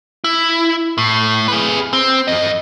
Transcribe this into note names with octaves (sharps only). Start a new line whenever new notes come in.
E4
A2
G#4 B4
C4
F2 D#5